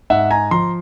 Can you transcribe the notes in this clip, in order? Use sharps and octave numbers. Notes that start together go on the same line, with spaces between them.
G#2 E5 F#5
G#5 A#5
F3 A#5 C6